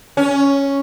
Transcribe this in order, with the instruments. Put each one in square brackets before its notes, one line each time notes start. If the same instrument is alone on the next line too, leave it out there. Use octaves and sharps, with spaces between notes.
[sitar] C#4